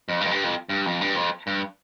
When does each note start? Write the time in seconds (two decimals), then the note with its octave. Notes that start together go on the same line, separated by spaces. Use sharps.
0.08 F2
0.21 G2
0.26 F2
0.31 G2
0.44 F2
0.69 G2
0.86 F2
1.01 G2
1.15 F2
1.47 G2